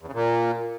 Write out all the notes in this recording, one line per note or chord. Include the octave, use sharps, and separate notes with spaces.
E2
C#3
A#2